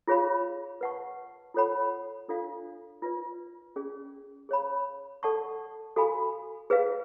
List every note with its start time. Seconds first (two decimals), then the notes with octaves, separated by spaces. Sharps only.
0.07 F4 G#4 C#5 F5 B5
0.81 B4 F#5 A5 C#6
1.54 F4 A4 C#5 F#5 B5
2.28 D4 F4 A4 D5 F5
3.02 F4 B4 D5
3.76 C#4 G#4 D5
4.49 G#4 C#5 F5 B5
5.23 A4 D5 F#5 A5 C#6
5.96 F#4 A4 F5 G#5 B5
6.70 G#4 B4 F5